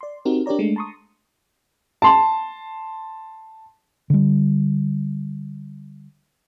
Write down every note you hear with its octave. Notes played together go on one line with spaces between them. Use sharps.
D5 C6
C4 D#4 F#4 G4 A#4
D4 G4 A#4 C#5 D5 A#5
G#3 A3 D4
A5 A#5 C6 C#6 D#6
A5 C6
D3 G3